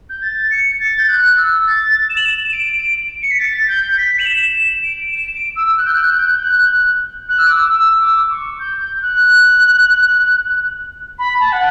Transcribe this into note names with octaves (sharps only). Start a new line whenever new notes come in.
G6
A6
C#7
A6
G6
F#6
E6
A6
E7
F#7
E7
E7
D7
C#7
B6
A6
G6
B6
F#7
E7
E7
D7
E7
D7
E6
F#6
G6
F#6
G6
F#6
G6
F#6
G6
F#6
G6
F#6
F#6
E6
D6
E6
E6
D6
C#6
G6
F#6
B5
A5
F#5